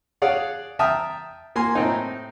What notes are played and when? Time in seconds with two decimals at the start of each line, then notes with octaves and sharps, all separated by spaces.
0.22 G#4 C#5 D5 F5 F#5
0.79 E5 G5 A5 A#5 D#6 F6
1.56 A#3 G#5 C6
1.75 A2 C4 D#4